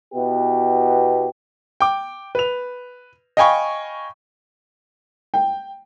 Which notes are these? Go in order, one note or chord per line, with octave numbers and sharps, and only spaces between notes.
B2 B3 E4 G4
G5 D6
B4 F7
D#5 F5 G5 G#5 B5 C#6
G5